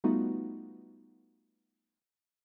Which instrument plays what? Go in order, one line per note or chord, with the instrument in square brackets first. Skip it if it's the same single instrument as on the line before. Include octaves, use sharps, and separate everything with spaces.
[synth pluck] G3 A3 B3 D#4 F4 F#4